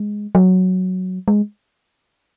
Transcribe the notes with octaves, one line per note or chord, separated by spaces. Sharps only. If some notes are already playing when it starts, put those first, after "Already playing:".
Already playing: G#3
F#3
G#3